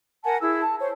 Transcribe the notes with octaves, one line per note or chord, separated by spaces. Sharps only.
A#4 F#5 G#5 A5
E4 G#4 E6
A5
C5 C#5